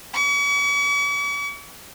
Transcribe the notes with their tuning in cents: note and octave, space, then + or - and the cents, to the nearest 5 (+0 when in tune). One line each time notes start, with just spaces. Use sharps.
C#6 +45